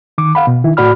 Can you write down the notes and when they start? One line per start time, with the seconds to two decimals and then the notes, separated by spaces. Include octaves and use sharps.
0.18 D#3 D6
0.35 F5 F#5 B5
0.47 B2
0.64 D#3 E4
0.77 A2 F#4 D5 B5 F6